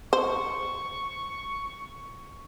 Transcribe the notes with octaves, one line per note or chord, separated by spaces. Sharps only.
C5 C#6